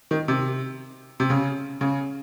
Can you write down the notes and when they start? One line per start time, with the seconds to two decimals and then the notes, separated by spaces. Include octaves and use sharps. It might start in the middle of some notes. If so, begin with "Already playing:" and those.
0.11 D#3
0.28 C3
1.20 C3
1.30 C#3
1.81 C#3